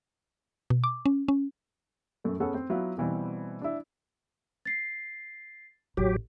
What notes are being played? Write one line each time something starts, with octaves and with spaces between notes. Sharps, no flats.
B2
D6
C#4
C#4
F#2 A3
B3 C#4 G#4 A4 F#5
C4
F#3 B3 E4 F4
B2 E3 G3 C4
D4 E4
A6 C7
A1 F#3 G4